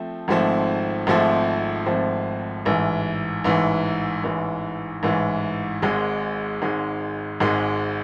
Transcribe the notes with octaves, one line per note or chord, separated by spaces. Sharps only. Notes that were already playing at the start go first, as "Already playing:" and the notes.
Already playing: F3 A3 C4
G#1 G#2 F3 A3 C4
G#1 G#2 F3 A3 C4
G#1 G#2 F3 A3 C4
A1 G#2 E3
A1 G#2 E3
A1 G#2 E3
A1 G#2 E3
G#1 G#2 G#3
G#1 G#2 G#3
G#1 G#2 G#3